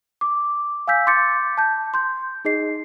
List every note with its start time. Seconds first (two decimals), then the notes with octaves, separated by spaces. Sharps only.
0.21 D6
0.87 F5 G#5 E6 G6 B6
1.07 C6 D6 G6 A6 C#7
1.58 A5 G6
1.94 C6 G6
2.45 D#4 G#4 D#5 C7